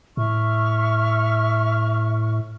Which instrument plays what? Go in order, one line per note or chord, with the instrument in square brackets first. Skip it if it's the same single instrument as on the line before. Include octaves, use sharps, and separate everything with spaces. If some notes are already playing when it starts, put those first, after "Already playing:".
[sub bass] A2 [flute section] E5 C#6 F6